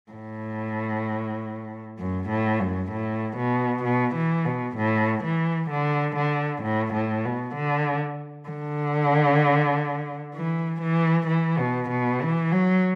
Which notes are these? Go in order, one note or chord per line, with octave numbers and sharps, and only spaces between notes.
A2
F#2
A2
F#2
A2
B2
B2
E3
B2
A2
E3
D3
D3
A2
A2
B2
D3
D3
E3
E3
E3
B2
B2
E3
F#3